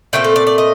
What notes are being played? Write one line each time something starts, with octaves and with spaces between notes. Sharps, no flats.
A#2 A3 C4 G5
A4
D5
D5
D#5